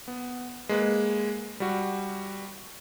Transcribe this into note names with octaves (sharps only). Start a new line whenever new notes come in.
B3
G#3 A#3 B4
G3 F#4